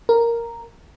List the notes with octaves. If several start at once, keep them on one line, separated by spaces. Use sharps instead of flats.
A#4